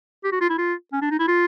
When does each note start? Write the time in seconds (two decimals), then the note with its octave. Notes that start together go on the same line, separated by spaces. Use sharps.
0.24 G4
0.32 F#4
0.41 F4
0.49 E4
0.58 F4
0.93 C#4
1.02 D4
1.11 D#4
1.20 E4
1.28 F4